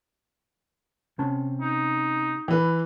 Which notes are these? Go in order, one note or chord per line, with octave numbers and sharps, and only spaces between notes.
C3 C#4 A5
D#4
E3 B4